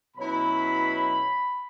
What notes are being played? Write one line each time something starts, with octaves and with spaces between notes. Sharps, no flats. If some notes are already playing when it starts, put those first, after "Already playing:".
B2 F#3 C#4 E4 B5